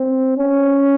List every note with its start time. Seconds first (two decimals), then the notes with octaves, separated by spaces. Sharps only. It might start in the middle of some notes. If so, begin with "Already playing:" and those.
Already playing: C4
0.38 C#4